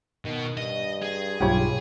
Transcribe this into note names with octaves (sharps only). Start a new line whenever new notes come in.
B2 D#3
G2 D#5
G#4
B1 G2 F4 G4 C#5 B5